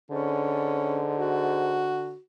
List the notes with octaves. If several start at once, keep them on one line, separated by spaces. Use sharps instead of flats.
G#2 D3 C#4
F#4